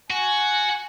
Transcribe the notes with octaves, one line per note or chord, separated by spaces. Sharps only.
F#4 G#5